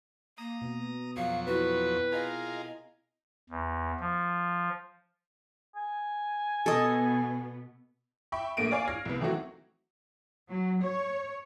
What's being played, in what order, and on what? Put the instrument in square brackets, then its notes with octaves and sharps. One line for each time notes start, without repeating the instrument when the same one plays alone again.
[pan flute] A#3 [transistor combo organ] A#5 D#6
[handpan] B2
[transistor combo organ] F2 F#3 C#5 [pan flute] F5
[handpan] C4 E4 [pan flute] F#4 [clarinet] B4
[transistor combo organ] F4 G#4 A#4 [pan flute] D#5
[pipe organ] E2
F3
[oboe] G#5
[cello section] B2 B3 [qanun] A4 D#5
[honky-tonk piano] E5 G5 B5 C#6
A#1 A3 A#3 D7 D#7
C#5 D5 F5 G#5 C#6
F6 G#6 A#6 C7
C2 B3
D#3 E3 F#3 A3 C4 F#4
[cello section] F#3
C#5